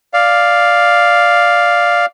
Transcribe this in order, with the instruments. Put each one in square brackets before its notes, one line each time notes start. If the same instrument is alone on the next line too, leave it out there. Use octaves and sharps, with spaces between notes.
[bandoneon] D5 F5